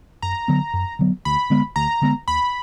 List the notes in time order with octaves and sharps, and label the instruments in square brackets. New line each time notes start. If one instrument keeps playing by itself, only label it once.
[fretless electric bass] F#2 [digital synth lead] A#5
[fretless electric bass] D3 F#3 B3
F#2
D3 F#3 B3
[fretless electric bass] D2 [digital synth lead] B5
[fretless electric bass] D3 G#3 B3
[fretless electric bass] D2 [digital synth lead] A#5
[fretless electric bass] D3 G#3 B3
[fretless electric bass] D#2 [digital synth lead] B5